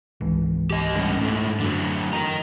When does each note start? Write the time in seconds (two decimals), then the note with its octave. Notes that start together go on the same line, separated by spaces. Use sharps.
0.21 G#1 C#2 E3
0.71 G4 D#5
0.95 D3 G3 C#4
1.17 G#2 A3
1.60 F#2 D3 F#3
2.13 A#4 D#5 A#5